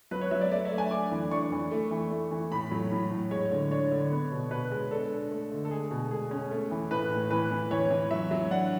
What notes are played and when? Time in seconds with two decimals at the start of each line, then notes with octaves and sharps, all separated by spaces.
0.11 F#3 B4
0.21 C#5
0.31 F#3 E5
0.41 D5
0.52 A3 D5
0.65 E5
0.72 A3
0.78 G#5
0.91 D4 D6
1.11 E3
1.31 D4 C#6
1.52 E3
1.71 A3
1.91 E3
2.11 A3
2.31 E3
2.52 A2 B5
2.71 F#3
2.92 A2
3.11 A2
3.31 G#3 C#5
3.51 D3
3.71 D4 C#5
3.91 D3
4.11 B3
4.32 B2
4.51 B2 B4
4.71 G#3
4.91 D4 A4
5.12 D4
5.31 A3
5.51 D3
5.65 A4
5.71 G#3 G#4
5.91 B2
6.11 G#3 G#4
6.31 C#4
6.51 A3
6.71 E3
6.91 A2 B4
7.11 A2
7.30 E3 B4
7.51 E3
7.71 E3 C#5
7.91 E3
8.11 F#3 E5
8.31 F#3
8.51 D4 F#5